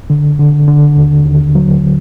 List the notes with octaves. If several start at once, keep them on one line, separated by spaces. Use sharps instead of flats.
D3
D3
D3
D#2
D#2
F#3